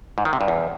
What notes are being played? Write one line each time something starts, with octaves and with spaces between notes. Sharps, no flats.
G#2
D#3
C3
G2
E2